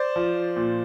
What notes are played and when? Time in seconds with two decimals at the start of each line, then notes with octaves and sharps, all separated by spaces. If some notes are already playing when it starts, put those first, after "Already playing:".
Already playing: C5 D5
0.16 F3
0.56 A#2